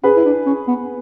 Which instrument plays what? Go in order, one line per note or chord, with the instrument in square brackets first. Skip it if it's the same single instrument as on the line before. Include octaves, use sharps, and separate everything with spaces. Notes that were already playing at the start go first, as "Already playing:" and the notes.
[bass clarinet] C#4 [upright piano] G#4 B4
[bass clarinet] E4
D4
C#4
B3